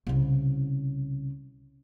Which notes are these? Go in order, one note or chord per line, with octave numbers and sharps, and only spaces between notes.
C2 C#3